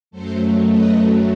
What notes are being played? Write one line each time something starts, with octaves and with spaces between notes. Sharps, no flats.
F#2 F#3 A3 A4 C5
B4 D#5